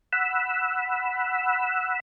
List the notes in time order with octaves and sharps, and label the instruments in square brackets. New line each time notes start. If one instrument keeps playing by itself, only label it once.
[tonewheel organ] F#5 B5 E6